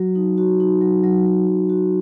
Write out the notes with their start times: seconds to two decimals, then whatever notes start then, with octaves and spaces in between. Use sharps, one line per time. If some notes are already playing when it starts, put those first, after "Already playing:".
Already playing: F#3 F#4
0.15 D#4
0.38 F#4
0.60 D#4
0.81 F#3
1.04 F#3
1.26 F#3
1.47 F#3
1.69 F#4